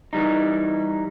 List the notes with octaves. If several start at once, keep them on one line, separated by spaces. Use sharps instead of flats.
E3 G3 D#4